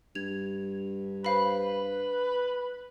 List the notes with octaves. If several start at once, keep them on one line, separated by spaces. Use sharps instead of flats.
G2 G#6 F7
B4 C5 F5 B5